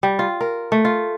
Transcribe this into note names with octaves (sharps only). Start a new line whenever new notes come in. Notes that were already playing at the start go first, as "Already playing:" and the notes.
G3
F4
A#4
A3
F4